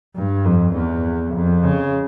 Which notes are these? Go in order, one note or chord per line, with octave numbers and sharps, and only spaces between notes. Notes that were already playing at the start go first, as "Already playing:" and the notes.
G2
F2
E2
F2
C#3